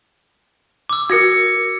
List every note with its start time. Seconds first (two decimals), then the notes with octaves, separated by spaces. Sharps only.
0.89 D6 E6
1.10 F#4 A#4 G#6 A#6 C#7